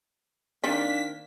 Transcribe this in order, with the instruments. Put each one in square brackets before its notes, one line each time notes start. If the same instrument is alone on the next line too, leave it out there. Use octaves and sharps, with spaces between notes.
[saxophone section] D#3 A#3 D4 [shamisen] C4 D#4 D5 [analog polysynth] B6